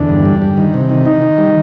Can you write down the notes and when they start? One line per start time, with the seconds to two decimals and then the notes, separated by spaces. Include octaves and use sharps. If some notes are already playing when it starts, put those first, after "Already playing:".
Already playing: E2 D3 D4
0.09 G2
0.25 G3
0.42 G3
0.57 D#3
0.74 C3
0.90 D#3
1.06 D#3 D#4
1.22 D#3
1.38 G3